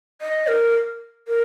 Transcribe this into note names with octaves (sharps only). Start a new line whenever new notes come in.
D#5
A#4
A#4